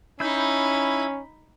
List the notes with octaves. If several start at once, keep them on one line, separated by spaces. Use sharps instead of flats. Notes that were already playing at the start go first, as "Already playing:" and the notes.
C#4 D#4 E4 B5 G6